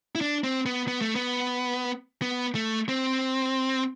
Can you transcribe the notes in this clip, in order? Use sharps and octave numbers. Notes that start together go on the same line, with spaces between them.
E4
D4
C4
B3
B3
A3
B3
B3
A3
C4